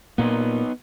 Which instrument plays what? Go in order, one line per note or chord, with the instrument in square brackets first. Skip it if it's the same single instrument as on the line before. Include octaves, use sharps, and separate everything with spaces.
[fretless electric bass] A#2 A#3 [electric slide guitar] B3 D#4